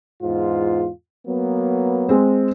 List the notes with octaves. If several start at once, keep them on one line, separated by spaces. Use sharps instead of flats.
E2 G#2 F4
F#3 A#3 B3
G#3 C4